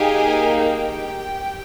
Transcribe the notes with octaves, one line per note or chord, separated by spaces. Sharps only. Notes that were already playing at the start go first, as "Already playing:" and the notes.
Already playing: A#3 D#4 G4 G#4 G#5
G4 G5
G4